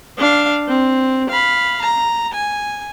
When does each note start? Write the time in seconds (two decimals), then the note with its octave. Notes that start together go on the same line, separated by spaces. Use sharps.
0.18 D4 F5
0.68 C4
1.30 F5 B5
1.82 A#5
2.34 G#5